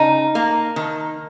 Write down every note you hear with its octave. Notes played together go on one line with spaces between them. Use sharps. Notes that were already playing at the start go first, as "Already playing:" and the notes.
Already playing: C#3 D#4
A#3
D#3